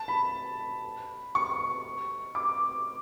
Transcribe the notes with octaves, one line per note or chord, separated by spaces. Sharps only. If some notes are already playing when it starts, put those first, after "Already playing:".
Already playing: A5
B5
C#6
D6